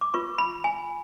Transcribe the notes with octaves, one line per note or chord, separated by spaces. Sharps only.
D6
F4 B4 C#6
B5
G#5